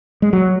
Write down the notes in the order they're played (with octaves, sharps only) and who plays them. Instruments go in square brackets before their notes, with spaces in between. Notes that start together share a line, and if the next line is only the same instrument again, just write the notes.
[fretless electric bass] G#3
F#3